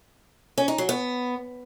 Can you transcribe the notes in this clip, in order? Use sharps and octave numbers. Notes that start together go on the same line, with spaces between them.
C#4
D#4
F#3
B3